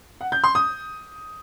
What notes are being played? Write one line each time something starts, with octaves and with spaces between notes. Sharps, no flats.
F#5
G6
C6
D#6